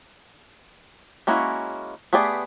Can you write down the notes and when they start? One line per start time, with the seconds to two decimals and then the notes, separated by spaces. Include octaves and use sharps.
1.27 G#3 A#3 C#4 E4 F#4
2.13 A3 B3 G4 G#4 D5